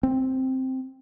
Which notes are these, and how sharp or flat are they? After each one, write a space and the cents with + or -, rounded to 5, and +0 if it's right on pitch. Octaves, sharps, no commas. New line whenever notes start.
C4 +0